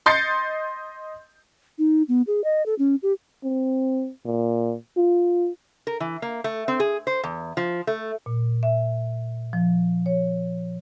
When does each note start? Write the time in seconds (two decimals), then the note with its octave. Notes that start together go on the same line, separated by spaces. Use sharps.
0.06 D#5 C6 G6 A6 C7 C#7
1.79 D#4
2.09 B3
2.27 G#4
2.44 D#5
2.66 A4
2.79 C#4
3.03 G4
3.44 C4
4.26 A#2
4.97 F4
5.87 A#4
6.00 E3
6.22 A#3
6.44 A3
6.68 C4
6.80 G#4
7.07 C5
7.24 E2
7.57 F3
7.87 A3
8.26 A#2
8.63 E5
9.53 F3
10.06 C#5